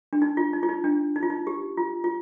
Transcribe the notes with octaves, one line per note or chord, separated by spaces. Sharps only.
D4
D#4
F4
D#4
F4
D#4
D4
D#4
F4
D#4
G4
F4
F4